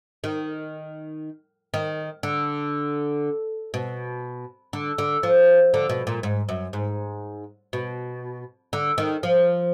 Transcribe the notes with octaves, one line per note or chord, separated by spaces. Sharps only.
D#3
D#3
D3
B2
D3
D3
F3
D3
B2
A#2
G#2
F#2
G#2
B2
D3
D#3
F3